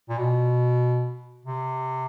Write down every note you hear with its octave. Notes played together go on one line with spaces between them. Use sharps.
A#2
B2
C3